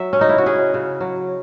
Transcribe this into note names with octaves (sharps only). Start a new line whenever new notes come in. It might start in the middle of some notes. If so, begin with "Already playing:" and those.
Already playing: F#3 E5
C#4
C#3 D#4
E4
F#4
C#4 G#4
C#3
F#3